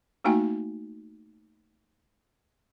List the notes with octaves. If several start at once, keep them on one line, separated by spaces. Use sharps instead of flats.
A3 A#3 D#4 F#4 G5 G#5